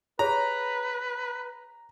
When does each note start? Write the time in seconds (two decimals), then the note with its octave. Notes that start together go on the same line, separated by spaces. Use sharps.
0.19 G4 G#4 B4 C#5 A#5